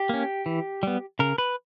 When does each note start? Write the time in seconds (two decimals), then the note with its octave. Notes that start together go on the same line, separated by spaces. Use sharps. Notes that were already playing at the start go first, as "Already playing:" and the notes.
Already playing: G4
0.09 A#3 C#4
0.46 E3
0.83 G3 B3
1.19 C#3 A#4
1.38 B4